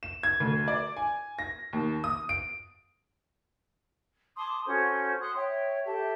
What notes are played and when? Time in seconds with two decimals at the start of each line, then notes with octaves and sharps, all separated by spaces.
0.03 E7
0.23 G#6
0.40 D2
0.68 D5
0.97 G#5
1.39 A#6
1.73 D#2
2.04 D#6
2.29 D7
4.36 A5 C6 D6 D#6
4.66 C#4 F#4 A4 C5
5.20 F#5 C6 D#6 F#6
5.35 C#5 E5 G5
5.85 G4 A4 E5 A5